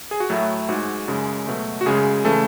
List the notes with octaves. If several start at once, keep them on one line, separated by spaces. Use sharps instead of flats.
G#4
F#4
A2 F#3 A3 E4
G#2 G#3 F#4
F#2 C#3 G#3
B2 F#3 A3
F#4
F#2 C#3 G#3 G#4
C#3 E3 A3 A4